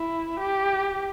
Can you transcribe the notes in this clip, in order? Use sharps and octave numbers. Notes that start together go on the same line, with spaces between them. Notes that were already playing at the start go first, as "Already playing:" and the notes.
Already playing: E4
G4